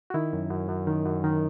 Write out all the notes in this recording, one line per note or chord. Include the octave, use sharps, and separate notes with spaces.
F#4
D#3 E4
F#2
F#2
F#2
D#3
F#2
D#3